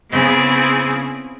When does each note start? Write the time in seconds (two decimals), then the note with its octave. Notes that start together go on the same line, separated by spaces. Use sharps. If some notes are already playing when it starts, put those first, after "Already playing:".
0.10 C#3 B3 C4 E4 G#4